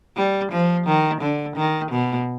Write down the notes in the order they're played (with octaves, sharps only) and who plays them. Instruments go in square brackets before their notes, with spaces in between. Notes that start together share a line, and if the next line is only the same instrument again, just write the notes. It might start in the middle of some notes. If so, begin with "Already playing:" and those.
[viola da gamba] G3
F3
D#3
D3
D#3
B2